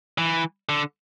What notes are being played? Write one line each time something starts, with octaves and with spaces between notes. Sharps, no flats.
E3
D3